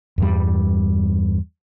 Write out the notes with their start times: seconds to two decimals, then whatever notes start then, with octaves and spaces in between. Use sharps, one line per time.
0.18 E2 G2 G3